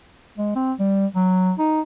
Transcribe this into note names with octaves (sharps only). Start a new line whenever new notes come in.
G#3
C4
G3
F#3
D#4